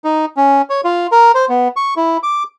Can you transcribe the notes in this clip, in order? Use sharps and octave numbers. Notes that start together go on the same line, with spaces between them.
D#4
C#4
C#5
F4
A#4
C5
B3
C#6
E4
D6